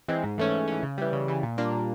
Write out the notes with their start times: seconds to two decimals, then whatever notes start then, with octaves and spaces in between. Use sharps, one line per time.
0.08 E3 G#3 C4
0.23 G#2
0.38 E3 A3 C#4
0.53 G#2
0.68 E3 A3 C#4
0.83 C#3
0.98 E3 G3
1.13 C#3
1.28 E3 G3
1.43 A#2
1.58 G3 A#3 D4 F4
1.72 A#2